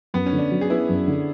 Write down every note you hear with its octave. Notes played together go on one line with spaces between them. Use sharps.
F#2 B3
C#4
D3
D4
F#3
G#4
B3 E4
F#2
D3